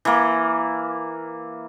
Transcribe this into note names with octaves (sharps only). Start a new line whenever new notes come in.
E3 A#3